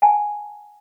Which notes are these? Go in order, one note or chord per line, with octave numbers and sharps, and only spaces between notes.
F#5 G#5 A5